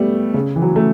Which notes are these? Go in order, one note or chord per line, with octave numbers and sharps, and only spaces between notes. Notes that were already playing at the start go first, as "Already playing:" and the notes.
Already playing: G3 A3 B3
C#3
E3
F#3
A3